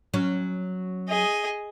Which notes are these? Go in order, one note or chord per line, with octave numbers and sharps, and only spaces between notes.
F#3 C#4
G#4 D#5